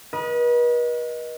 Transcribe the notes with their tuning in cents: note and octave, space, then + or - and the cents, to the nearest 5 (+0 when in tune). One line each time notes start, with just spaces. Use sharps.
B4 -40 D#5 +0